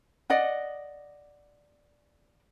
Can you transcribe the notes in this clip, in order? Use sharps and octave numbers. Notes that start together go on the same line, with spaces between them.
D5 D#5 F#5